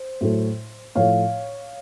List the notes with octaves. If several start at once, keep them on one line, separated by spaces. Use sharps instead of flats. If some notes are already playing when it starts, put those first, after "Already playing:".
Already playing: C5
A2 F#3 A3
A2 F3 A3 C#5 F5